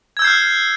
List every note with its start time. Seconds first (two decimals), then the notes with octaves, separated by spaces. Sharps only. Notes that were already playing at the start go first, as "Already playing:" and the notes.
0.17 G#6
0.19 E6
0.22 G6
0.24 C7
0.27 F6